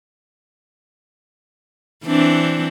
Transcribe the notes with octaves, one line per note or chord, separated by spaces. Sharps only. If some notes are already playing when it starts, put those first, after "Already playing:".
E3 C4 D4